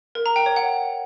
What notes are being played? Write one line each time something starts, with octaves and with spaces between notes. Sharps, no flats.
A#4
A#5
G5
C#5
F#5